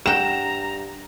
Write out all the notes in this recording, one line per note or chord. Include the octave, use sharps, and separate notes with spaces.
G2 F#5 G5 A#5 E7